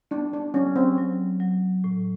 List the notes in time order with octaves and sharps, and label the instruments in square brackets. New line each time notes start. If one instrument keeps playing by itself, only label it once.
[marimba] B3 [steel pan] D4
[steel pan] D4
[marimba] F#3 [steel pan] C#4
[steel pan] C4
[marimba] F#3
F#3
A2